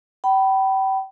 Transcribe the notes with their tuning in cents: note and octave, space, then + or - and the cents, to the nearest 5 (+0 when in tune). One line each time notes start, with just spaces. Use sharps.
G5 -35 B5 +0